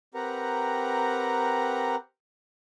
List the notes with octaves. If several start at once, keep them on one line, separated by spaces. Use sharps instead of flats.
C4 G4 A#4 B4 F#5 A#5